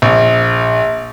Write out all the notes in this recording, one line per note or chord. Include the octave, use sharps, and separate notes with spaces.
A#1